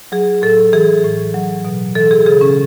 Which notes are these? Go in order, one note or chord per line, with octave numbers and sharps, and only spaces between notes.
F#3 G#4
A2 A4
E3 G#4
A2
F#3
B2
E3 A4
G#4
C#3 G#4
C#4